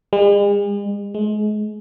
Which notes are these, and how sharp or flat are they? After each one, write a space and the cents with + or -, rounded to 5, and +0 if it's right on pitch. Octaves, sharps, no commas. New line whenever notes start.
G#3 -45
G#3 +30